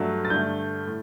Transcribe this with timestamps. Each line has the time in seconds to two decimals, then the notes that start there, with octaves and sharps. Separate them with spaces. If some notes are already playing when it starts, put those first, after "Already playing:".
Already playing: G2 F#3 A3
0.25 A6
0.30 G2 D3 A3 G6
0.87 A2